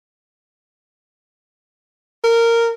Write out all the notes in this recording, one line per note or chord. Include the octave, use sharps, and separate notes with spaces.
A#4